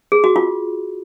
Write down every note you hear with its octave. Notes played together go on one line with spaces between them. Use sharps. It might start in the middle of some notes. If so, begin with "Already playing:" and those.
G#4
F#4
F4